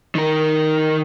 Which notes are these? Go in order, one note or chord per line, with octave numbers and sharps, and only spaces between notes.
D#3 A#4